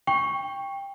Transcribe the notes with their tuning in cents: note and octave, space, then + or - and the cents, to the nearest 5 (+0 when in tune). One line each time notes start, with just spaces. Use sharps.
G5 +15 C#6 +0